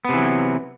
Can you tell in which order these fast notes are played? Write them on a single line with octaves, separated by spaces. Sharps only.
B3 C3 E3 F#3